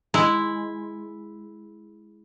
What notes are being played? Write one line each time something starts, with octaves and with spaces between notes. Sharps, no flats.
G#3 E4